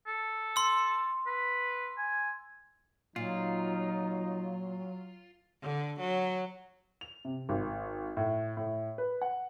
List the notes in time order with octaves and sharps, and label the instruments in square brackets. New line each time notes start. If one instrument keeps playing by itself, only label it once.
[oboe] A4
[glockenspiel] C6 E6
[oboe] B4
G#5
[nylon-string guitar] A#2 [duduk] F#3 [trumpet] D#4 [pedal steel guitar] F4
[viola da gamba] D3
F#3
[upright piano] F7
C3
G#1
A2
A2
B4
F#5